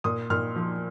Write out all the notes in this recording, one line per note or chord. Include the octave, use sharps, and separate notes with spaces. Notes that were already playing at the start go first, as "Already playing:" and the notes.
A#2 D#6
A#2 F6
F3